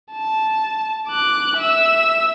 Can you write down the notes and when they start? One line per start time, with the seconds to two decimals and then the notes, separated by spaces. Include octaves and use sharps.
0.12 A5
1.09 D6 F#6
1.57 E5 E6